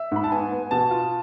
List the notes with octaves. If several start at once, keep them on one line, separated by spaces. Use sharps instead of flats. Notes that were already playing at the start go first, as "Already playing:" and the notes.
Already playing: E5
G#2 B5
A5
B3 G#5
B3
B2 A5
F4